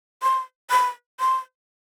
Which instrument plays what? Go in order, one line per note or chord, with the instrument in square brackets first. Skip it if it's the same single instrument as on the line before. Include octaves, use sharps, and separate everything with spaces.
[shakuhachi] C6
B5
C6